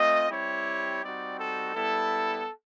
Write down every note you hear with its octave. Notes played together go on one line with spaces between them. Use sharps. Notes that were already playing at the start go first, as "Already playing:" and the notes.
Already playing: A3 C4 F4 D#5
G3 C4 E4 G4 C#5
G3 C4 D#4 F#4 D5
A4
G3 B3 E4 A4